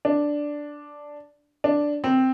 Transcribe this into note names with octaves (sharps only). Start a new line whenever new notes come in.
D4
D4
C4